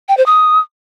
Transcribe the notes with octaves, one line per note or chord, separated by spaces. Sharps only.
G5
C5
D#6